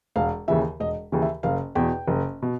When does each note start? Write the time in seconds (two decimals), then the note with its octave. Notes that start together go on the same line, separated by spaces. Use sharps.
0.16 E1 F5
0.48 D#2 C#3 E3 E5
0.80 E1 D#5
1.12 D#2 C#3 E3
1.22 E5
1.43 F#1 F5
1.75 E2 B2 G5
2.08 F#1
2.42 B2